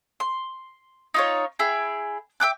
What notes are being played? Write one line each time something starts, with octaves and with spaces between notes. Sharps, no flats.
C6
D#4 F4 C#5
E4 G#4 G5 G#5
E5 G5 D6 F#6